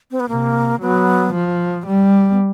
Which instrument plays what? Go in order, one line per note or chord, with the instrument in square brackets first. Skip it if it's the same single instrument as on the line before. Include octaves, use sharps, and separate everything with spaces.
[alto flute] C4
B3
[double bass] C3 [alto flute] A#3
[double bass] F#3 [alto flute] B3
[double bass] F3
G3
[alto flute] B3